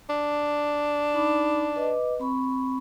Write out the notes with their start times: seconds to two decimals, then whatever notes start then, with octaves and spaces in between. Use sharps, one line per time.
0.09 D4
1.14 D#4 B5 D6
1.76 B4 D#5 D6
2.20 C4 B5 C#6